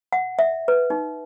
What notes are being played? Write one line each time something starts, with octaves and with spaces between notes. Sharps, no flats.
F#5
E5
B4
D#4